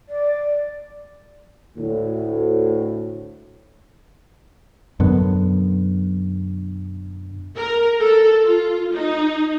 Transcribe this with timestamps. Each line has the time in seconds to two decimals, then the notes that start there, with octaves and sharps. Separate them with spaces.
0.09 D5
1.78 D2 A2
5.00 F#2 B2 D3 B3
7.58 A#4
7.99 A4
8.45 F4
8.93 D#4